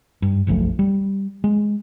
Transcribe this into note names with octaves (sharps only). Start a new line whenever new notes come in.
G2
F#1 B1 F3 A3
G3
G#3